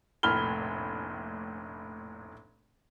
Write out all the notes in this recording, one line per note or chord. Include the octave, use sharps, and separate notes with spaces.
F1 A#1 A2 B5 F6 G7